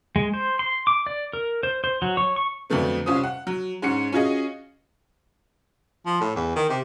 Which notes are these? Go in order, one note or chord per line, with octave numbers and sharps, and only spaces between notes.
G#3
C5
C6
D6
D5
A#4
C5
C5
F#3
C#5
C#6
F2 D3 F#3 A3 B3
C2 C#4 F4 C5 D#6
F#5
F#3
G#2 C#4 F#5 C#7
C#4 F4 F#4 G#4 D#5
F3
A2
E2
D#3
C3